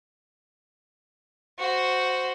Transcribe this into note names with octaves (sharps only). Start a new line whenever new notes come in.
F#4 C5